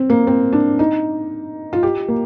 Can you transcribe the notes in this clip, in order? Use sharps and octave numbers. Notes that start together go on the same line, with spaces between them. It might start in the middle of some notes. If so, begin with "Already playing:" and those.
Already playing: C4
A#3
C4
D4
D#4
F4
G4
A#3